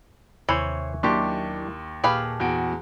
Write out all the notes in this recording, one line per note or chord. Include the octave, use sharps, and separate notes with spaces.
D#2 C3 E3 C5 C#5 C#6
D#2 F#3 A#3 D4 E4 G4 C6 C#6
A#2 G4 G#4 B4 F5 A5
E2 F#4 D7